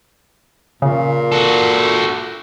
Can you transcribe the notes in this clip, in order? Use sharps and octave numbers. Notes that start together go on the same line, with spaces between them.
A#2 C#3
F#4 A4